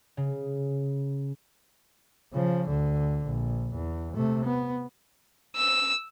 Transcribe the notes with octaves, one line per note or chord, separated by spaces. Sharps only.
C#3
C#3 F3
D2 D3
A#1
E2
C3 A3
B3
E6